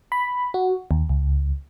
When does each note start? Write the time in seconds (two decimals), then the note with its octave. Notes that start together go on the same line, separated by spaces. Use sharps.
0.12 B5
0.54 F#4
0.91 D#2
1.09 C#2